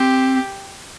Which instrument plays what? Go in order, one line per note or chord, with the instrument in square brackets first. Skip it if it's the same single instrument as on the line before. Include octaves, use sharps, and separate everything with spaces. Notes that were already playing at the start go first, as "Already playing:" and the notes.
Already playing: [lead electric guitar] C4 [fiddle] G4